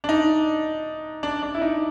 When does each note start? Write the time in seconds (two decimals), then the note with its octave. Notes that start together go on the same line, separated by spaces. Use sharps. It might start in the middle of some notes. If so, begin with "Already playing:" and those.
0.04 D4
0.09 D#4
1.23 D4
1.42 D4
1.54 E4
1.61 D#4